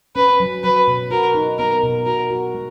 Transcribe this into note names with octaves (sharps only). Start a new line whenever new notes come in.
C#4 B4
F#3
F#3 B4
B2
F#4 A#4
D#4
B3 A#4
B2
F#4 A#4
F#4
G#3